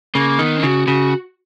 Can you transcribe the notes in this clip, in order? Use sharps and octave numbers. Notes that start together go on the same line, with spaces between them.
C#3 A#3
D#3 B3
C#3 F#4
C#3 F#4